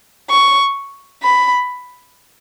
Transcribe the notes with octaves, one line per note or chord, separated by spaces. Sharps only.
C#6
B5